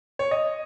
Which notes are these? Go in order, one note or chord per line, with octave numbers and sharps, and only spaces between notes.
C#5
D#5